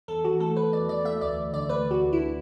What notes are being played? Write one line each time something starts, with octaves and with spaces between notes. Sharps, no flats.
E2 A4
E3 F#4
A3 A4
E2 B4
E2 D5
E3 D5
A3 E5
D2 D5
D2
D3 D5
A3 B4
D2
F#4
D2
D3 E4